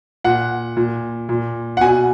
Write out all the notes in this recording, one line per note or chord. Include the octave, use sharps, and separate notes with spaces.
A#2 F#5
A#2
A#2
F#5
B2 G#5